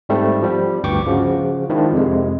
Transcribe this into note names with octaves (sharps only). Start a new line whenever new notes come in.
G#2 G3 A3 C4
F3 G3
G1 D2 G2 G5 C#6 D6
C#3 F3 F#4
D#3 F3 G#3 D4 E4
F2 C3 G#3